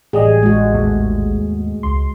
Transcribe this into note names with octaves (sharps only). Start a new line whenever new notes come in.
A1 G3 G#4 D#5
G#3 F#4
D#2 G#2 A3
C#2 C6